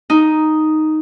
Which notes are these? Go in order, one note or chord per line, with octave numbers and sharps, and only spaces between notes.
D#4